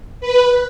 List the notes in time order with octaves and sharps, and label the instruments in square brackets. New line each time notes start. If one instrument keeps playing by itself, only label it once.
[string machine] B4